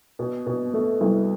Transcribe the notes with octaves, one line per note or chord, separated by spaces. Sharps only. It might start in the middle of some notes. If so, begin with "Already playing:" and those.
B2
B2
A3
C2